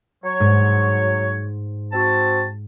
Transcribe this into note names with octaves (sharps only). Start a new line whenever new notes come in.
F#3 C#5
G#2
C4 F#4 A5